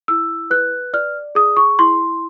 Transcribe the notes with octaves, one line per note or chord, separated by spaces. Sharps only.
E4 E6
B4 F#6
D5 F6
G#4 D#6
C#6
E4 C6